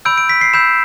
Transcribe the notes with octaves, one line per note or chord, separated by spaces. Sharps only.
B5 E6 G6 D7
D7
B6
C7
B5 E6 G6 E7